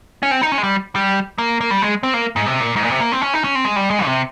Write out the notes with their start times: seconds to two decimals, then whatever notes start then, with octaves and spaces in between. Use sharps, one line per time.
0.23 C#4
0.31 C4
0.41 D#4
0.52 C#4
0.58 G#3
0.64 G3
0.96 G3
1.38 A#3
1.61 A#3
1.71 G3
1.82 G#3
2.03 C4
2.14 A#3
2.36 G#2
2.46 C3
2.60 A#2
2.76 G#2
2.83 A#2
2.90 C3
3.01 A#3
3.12 C4
3.22 C#4
3.34 D#4
3.44 C#4
3.55 C4
3.65 G#3
3.76 G3
3.90 G#3
4.06 C3